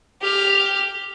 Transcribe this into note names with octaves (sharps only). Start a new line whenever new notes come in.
G4 F6